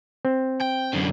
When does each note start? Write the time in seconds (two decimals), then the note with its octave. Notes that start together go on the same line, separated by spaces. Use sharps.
0.25 C4
0.61 G5
0.93 F#2 D3